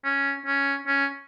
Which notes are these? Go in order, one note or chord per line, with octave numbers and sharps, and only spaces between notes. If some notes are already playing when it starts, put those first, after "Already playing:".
C#4
C#4
C#4